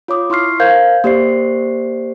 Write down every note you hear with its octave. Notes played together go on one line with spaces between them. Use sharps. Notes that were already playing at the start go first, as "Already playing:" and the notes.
F4 C#5 D6 D#6
E4 C6 C#6 F6 C7
A#4 C5 F5 G6 G#6
A#3 G4 C5 D5 C7